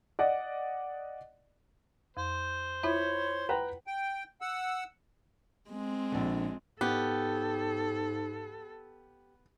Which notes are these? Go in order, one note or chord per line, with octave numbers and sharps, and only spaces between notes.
D5 D#5 F#5
F2 C5
E4 F4 C#5 E5 B5
B4 F#5 G5 A#5
G5
F#5 E6
G#3 C4
A#1 D3
G#2 B3 G4 A4